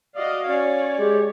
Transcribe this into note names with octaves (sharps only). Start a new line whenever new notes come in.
F#4 D5 D#5 F5
C#4 C#5 D5
G#3 G4